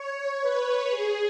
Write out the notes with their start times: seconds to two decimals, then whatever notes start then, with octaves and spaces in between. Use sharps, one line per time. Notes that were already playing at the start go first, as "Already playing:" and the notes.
Already playing: C#5
0.41 B4
0.90 G#4